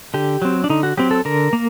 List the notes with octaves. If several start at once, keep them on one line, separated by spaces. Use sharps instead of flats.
D3 G4
F#3 C4
D4
D3 D#4
F#4
F#3 C4 G4
A4
D3 A#4
A#3